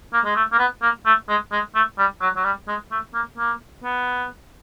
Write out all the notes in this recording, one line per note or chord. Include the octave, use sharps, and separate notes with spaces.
A#3
G#3
A3
A#3
B3
A#3
A3
G#3
G#3
A3
G3
F#3
F#3
G3
G#3
A3
A#3
A#3
B3